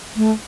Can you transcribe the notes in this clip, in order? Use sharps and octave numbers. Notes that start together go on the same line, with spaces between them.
A3